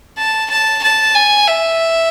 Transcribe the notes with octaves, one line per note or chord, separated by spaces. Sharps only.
A5
A5
A5
G#5
E5